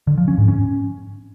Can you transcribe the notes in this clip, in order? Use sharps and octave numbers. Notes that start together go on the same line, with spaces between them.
D3
F3
C#4
G#2
C#4